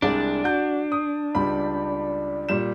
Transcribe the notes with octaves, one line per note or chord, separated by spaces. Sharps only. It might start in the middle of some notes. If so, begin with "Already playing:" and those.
C2 G#3 D4 D5
F#4 G6
D#6
C#2 G3 B5
A#2 G3 E7